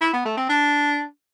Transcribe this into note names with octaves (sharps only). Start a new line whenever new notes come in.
E4
B3
A3
C4
D4